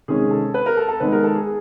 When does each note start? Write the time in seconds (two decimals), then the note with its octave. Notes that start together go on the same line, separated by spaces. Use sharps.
0.08 C3 D#3 G#3 C#4 G#4
0.31 A4
0.54 B4
0.66 A#4
0.77 A4
0.88 A4
1.00 D#3 G#3 B3 D#4 B4
1.12 A#4
1.24 A4
1.35 G#4